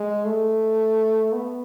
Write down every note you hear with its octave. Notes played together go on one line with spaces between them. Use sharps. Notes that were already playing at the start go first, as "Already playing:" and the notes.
Already playing: G#3
A3
B3